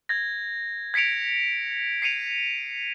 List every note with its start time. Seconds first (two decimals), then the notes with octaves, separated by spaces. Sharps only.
0.09 G#6 A#6
0.94 G#6 B6 C#7 D7 F7
2.02 C7 C#7 D#7 F7